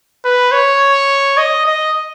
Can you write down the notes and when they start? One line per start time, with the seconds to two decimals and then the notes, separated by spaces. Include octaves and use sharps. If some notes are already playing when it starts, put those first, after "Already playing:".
0.25 B4
0.52 C#5
1.38 D#5
1.66 D#5